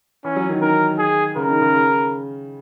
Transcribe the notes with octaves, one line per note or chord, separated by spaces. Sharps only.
E3 C#4
F#3
D#3
D#3 A#4
G#4
C#3 A#4
D#3
C#3
C#3